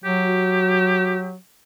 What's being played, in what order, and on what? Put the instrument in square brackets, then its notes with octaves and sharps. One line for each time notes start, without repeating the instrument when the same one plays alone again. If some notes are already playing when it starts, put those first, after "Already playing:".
[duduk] F#3 [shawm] G4
[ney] F#4